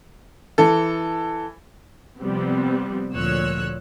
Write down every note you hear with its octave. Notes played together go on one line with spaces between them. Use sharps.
E3 A4
C3 F3 G3 B3 C4
D2 A#2 F3 C#5 E6 F#6